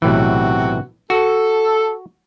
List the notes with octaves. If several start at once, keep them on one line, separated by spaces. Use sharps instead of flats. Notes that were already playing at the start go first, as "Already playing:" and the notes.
B1 A2 C3 E3 F#4
F#4 A4